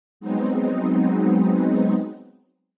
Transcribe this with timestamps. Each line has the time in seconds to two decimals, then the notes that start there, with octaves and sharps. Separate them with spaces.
0.20 F#3 G#3 B3 C4 D#4